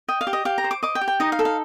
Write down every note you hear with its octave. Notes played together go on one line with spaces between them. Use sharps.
D#5 G5
F5
G4
D#5
G4 F5
A#5
C5
D6
D#5 D6
G5
G4
G5
D#4 D#5
F5
A4
F5